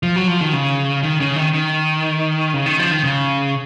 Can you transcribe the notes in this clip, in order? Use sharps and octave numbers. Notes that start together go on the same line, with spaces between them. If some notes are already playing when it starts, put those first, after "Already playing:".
F3
F#3
F3
D#3
C#3
D#3
C#3
D#3
D#3
C#3
D#3
F3
D#3
C#3